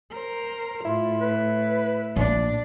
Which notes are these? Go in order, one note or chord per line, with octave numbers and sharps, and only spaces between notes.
A#4 C5
A2 E4 F4
B4
A#1 D4